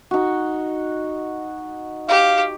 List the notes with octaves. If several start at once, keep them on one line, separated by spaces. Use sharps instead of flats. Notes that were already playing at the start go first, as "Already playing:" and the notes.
D#4 F#4
G4 F5